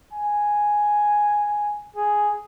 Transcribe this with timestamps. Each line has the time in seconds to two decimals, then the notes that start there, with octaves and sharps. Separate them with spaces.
0.13 G#5
1.96 G#4